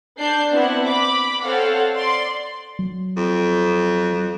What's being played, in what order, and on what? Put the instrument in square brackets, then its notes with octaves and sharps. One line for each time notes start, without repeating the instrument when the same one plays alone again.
[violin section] D4 G6 C7
B3 C4 D4 E4 F#5
B5 D6
C4 A4 C#5 F5 F#5
D5 C6
[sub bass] F#3
[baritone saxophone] F2